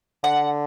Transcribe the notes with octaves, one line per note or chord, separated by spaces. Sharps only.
D3 F#5